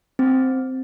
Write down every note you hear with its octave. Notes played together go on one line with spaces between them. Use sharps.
C4